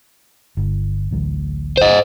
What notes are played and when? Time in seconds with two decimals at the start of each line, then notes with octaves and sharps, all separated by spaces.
0.57 G1
1.11 A1 D2 F#3
1.77 C5 D#5